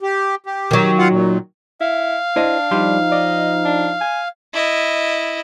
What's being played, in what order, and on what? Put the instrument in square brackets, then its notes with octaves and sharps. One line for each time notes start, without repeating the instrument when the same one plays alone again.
[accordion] G4
G4
[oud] D#3 F#3
[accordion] F4 F5 F#5
A#2
[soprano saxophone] E4 [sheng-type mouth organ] F5
[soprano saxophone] D4 [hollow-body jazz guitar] E4 C5 D#5
[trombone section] F3 D#4 [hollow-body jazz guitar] G3 G4 C6
[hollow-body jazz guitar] D5 [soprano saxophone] D#5
[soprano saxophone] D4
G#5
[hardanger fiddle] E4 D#5